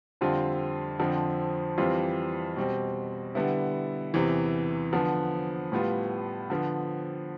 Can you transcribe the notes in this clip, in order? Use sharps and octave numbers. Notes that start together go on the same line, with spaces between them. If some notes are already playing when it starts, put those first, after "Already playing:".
F2 D3 G3 C4 F4
F2 D3 F3 C4
F2 E3 G3 C4 F4
B2 G3 C4
D3 G3 B3 E4
E2 C3 E3
D3 F3 B3
A2 G3 B3 F4
D3 F3 B3